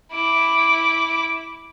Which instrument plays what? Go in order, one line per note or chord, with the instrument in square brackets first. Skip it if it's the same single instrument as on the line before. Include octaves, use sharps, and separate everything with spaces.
[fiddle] E4 D6